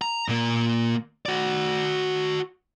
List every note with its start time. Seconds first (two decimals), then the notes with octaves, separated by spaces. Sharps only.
0.02 A#5
0.28 A#2 A#3
1.26 F#4 D5